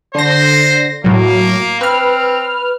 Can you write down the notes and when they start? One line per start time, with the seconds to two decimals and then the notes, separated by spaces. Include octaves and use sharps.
0.15 D3 C5 A#6
1.04 A2 F#3 A#3
1.81 C4 B4 F6